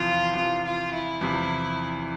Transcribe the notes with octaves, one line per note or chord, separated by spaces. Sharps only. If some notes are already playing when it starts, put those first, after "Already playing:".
Already playing: E2 C3 F3 F4
E2 C3 F3 F4
F4
E4
E2 C3 F3